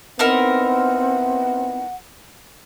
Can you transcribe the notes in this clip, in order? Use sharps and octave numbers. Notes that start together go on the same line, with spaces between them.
B3 C4 D#4 E4 A#4 F#5